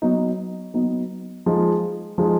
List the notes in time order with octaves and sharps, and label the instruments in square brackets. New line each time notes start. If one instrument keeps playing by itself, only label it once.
[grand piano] F#3 B3 D#4
F#3 B3 D#4
F3 G#3 D#4
F3 G#3 D#4